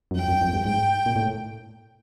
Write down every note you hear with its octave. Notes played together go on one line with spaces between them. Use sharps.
F#2
F2 G5
F#2
F2
G2
G#2 G5
A#2
A2